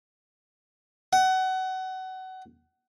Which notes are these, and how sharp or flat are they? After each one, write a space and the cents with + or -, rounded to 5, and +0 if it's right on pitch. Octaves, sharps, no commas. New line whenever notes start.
F#5 +25